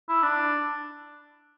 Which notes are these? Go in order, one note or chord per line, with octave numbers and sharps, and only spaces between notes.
E4
D4